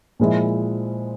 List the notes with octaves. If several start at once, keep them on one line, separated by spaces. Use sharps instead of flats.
A#2 F3 G#3 E4